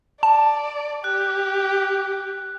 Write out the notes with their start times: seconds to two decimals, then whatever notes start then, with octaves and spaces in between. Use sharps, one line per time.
0.23 D5 A5
1.04 G4 F#6